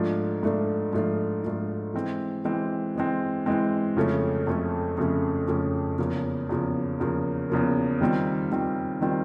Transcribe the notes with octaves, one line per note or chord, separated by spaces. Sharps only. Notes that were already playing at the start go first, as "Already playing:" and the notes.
Already playing: G#2 F3 A3 D4 F4
G#2 F3 A3 D4 F4
G#2 F3 A3 D4 F4
G#2 F3 A3 D4 F4
E3 G#3 C4
E3 G#3 C4
E3 G#3 C4
E3 G#3 C4
F2 C#3 F3 A3 C#4
F2 C#3 F3 A3 C#4
F2 C#3 F3 A3 C#4
F2 C#3 F3 A3 C#4
E2 C#3 F3 A#3
E2 C#3 F3 A#3
E2 C#3 F3 A#3
E2 C#3 F3 A#3
D#3 G3 C4 F4
D#3 G3 C4 F4
D#3 G3 C4 F4